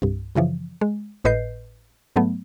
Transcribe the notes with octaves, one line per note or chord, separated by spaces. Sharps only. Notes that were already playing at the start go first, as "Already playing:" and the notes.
C2 G2
F#2 C#3 E3 F3
G#3
G#1 A2 B4 D#5 G6 C7
G#2 F#3 A3 B3